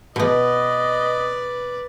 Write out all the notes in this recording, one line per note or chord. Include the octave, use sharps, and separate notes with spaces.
B2 B3 B4 D5 D#5